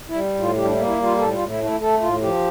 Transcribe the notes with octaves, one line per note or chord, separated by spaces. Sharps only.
E4
G3
A2
F4
G3 G4
D4
A#3 E4
E4
G3
F4
A2 A4
A2 F4
E4
A3
E4
A3 A4
A2 F4
F3 G4